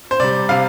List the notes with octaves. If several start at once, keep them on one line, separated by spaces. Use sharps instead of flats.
C5
C3 G3 D5
C3 G3 F5